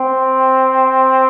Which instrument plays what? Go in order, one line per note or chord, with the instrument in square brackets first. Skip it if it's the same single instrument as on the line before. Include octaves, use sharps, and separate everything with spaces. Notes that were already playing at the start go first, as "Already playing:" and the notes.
Already playing: [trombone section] C4